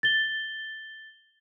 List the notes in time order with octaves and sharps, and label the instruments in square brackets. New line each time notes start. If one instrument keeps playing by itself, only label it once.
[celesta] A6 G7